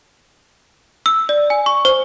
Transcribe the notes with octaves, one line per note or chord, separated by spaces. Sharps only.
E6
D5
G#5
C#6
C5